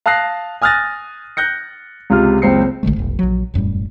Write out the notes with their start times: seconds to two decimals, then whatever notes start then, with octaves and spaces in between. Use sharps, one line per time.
0.06 F5 A5 D#6 F#6 A#6 C7
0.62 G#5 D#6 F6 F#6 A6 A#6
1.37 F#6 G6 A#6 C#7
2.10 C#2 C3 F4 F6
2.42 F#1 C#2 C4 C5 C7 C#7
2.83 A1 D3 G#3 A3
2.96 F1 B1
3.19 A#1 F#3
3.54 E1 F#2 A2 G3